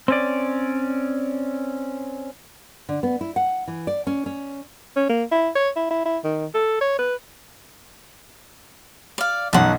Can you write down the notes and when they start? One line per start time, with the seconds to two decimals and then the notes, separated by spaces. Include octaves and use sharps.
0.08 C4 C#4 D5
2.89 D3
3.03 B3
3.21 E4
3.36 F#5
3.68 E3
3.87 D5
4.07 C#4
4.26 C#4
4.96 C#4
5.09 A#3
5.32 E4
5.55 C#5
5.76 E4
5.91 E4
6.06 E4
6.24 D#3
6.54 A4
6.81 C#5
6.99 B4
9.18 D5 F5
9.53 B1 F#2 D#4 F#5 A5